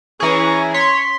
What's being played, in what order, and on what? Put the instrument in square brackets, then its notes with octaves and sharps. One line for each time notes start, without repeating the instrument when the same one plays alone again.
[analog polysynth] E3 G#4 [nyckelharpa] C#4 A#5 [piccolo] C#6
[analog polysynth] C#5 [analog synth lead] C6 [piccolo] B6